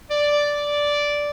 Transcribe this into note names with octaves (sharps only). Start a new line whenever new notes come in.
D5